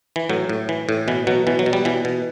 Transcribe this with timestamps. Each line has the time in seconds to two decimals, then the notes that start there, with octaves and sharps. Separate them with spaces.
0.16 E3
0.29 A2 F#3
0.49 A2
0.69 E3
0.89 A2
1.08 B2 E3
1.27 B2 F#3
1.47 B2 E3
1.59 F#3
1.66 B2
1.73 G3
1.85 B2 E3
2.05 B2